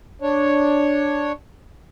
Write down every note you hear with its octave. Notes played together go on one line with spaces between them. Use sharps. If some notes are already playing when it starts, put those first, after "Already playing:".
D4 C#5